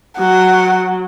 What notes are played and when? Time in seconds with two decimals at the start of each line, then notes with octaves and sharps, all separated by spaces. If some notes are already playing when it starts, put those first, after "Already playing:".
0.19 F#3 F#5